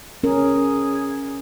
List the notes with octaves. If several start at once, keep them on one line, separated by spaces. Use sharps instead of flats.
C#4 G#4 A#4